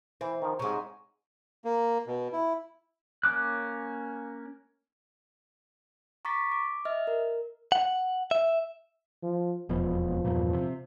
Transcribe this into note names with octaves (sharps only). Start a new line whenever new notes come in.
E3 C4
D#3 F3
G#2 C3 G#3 C#5
A#3
B2
E4
A#3 C#4 D6 F#6
A#5 C#6 D6 A6 B6
D6
D#5 E5 F6
A#4
F#5
E5
F3
E1 F2 B2 F3
E2 G2 A#2
C3